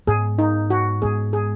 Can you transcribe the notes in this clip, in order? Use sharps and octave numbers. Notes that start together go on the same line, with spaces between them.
G#2 G#3 B3 G#4
D#4
F#4
G#2 G#3 B3 G#4
G#4